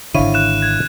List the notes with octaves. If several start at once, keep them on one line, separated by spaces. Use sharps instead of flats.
G#1 D3 E4 C#5 F5 D#7
F#6 E7
G#6